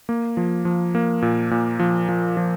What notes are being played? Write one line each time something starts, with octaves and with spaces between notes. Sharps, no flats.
A#3
F3
F3
A#3
A#2
A#2
F3
F3
F3